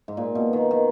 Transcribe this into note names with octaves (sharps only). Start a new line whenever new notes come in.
G#2
A#2
B2
D#3
D#3